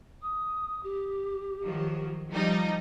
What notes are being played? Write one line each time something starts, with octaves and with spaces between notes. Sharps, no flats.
D#6
G4
D#3 F3 F#3
F3 G3 D#4